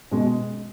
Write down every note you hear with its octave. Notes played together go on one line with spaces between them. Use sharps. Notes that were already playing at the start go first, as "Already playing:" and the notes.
B2 G#3